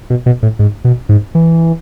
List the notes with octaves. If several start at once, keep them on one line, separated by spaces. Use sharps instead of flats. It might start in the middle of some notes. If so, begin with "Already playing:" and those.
B2
B2
A2
G#2
B2
G#2
E3